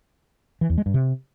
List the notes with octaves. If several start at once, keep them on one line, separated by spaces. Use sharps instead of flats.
E3
E2
G#3
G2
C3